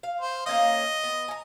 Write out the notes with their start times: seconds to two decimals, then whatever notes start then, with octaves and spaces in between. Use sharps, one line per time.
0.03 F5
0.21 C5
0.46 A#3 C#4 D#5 F5
1.03 B3
1.28 G#5 A#5